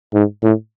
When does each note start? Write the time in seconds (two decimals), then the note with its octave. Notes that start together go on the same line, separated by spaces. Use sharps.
0.14 G#2
0.43 A2